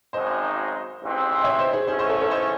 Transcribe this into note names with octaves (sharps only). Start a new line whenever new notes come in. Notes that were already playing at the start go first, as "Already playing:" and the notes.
G#1 F#2 C#3 G#3 D#4 C5 D#5
A1 G#2 E3 C4
D#5
C#5 E5
C5 D#5
G#4 C5
G#2 E3 A3 C#4 G#4 C5
C5 D#5
A4 C#5
A4 C#5
C5 D#5